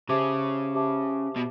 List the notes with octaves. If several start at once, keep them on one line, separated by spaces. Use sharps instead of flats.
C#3 G4 C5 E5 A5 D6
G4 C5 E5 A5 D6
B2